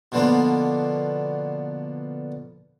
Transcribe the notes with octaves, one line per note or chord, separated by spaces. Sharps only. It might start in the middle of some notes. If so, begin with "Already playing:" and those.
B2 D3 F3 A#3 B3